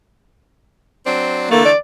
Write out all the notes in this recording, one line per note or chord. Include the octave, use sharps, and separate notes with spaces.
F#3 C4 D4
D3 E3 A3 A#3
D5